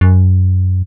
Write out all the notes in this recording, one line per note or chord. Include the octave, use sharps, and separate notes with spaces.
F#2